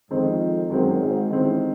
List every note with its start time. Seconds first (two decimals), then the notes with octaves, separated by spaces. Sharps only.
0.10 F2 D#3 G#3 C4
0.70 F#2 D#3 G#3 C4
1.00 G#1 G#2
1.30 A1 A2 D#3 G#3 C4